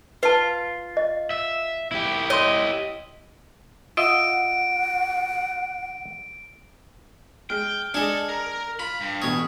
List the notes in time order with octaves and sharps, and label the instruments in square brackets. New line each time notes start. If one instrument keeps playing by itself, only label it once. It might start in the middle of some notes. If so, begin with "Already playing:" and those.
[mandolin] F4 [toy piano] B4 A5
[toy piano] D#5
[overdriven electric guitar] E5
E4 G4
[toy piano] C#5 C6 [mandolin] D#5
[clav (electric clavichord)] F4 D#5 E5 [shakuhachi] F#5 [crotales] D7
[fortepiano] G#3 [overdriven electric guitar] G5 [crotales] F6 F#6
[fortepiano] G#3 D4 [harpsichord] G#4 D#5 [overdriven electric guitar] A4
[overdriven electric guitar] A#4
[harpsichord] F4 [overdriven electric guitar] B5 [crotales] B6
[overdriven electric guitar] G2
[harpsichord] A1 B2 C#5 [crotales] D#6 G#6